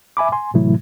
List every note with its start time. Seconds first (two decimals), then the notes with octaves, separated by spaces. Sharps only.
0.17 E5 G#5 B5 D6
0.32 G#5 C6
0.54 A2 C3 E3 F#3 A3 E4